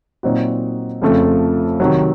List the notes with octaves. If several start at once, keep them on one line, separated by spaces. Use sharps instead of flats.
A#2 F#3 C4 D#4 F#4
F2 C#3 F3 A3 C4
C3 D#3 F#3